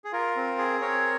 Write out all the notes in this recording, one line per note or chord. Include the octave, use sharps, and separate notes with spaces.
G#4
F4 A#4
C4
G#4
C4 A#4 C#5